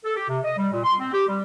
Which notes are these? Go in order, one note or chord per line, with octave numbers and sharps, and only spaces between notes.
A4
G4
C3
D#5
G3
A#2
C6
C4
G4
G3